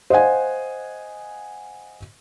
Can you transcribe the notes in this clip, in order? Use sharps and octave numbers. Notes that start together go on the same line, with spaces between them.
C5 D#5 F5 F#5 G#5